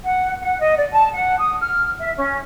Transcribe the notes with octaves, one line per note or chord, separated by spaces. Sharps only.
F#5
F#5
D#5
D5
A5
F#5
D#6
F6
E5
C#4